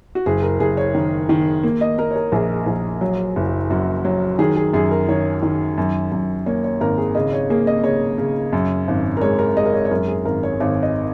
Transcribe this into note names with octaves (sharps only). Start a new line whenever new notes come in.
F#4
F#1 G#4
A#4
F#1 G#4
C#5
D#3
D#3
A#3
D#5
A#3 A#4
C#5
A#4
A#1 G#4
A#1
F#3
F#1
F#2 F#4
F#3
D#3 G#4
G#4
F#2 G#4
A#4
D#3 C#5
D#3
F#2
F#2
A#3 C#5
C#5
G#1 A#4
G#4
C#3 D#5
C#5
A#3 G#4
D#5
C#3 C#5
C#3
F#2
G#1
A#4
G#3 C#5
A#4
G#3 D#5
A#4
C#5
C#5
F#2 A#4
G#4
G#1 A#4
C#5
G#1 C#5
D#5